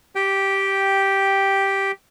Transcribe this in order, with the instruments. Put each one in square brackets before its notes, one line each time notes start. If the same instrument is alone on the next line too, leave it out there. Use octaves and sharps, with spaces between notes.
[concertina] G4 G5